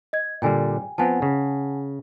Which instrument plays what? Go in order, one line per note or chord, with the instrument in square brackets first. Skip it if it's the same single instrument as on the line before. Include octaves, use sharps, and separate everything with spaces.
[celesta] D#5 G#6
[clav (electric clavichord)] A#2 D3 G3 [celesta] G5 G#5
[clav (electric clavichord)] F3 B3 C4 [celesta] F#5 G#5 A5
[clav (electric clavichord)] C#3